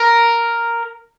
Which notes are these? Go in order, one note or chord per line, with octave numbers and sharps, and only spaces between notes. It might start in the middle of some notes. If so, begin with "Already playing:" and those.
Already playing: A#4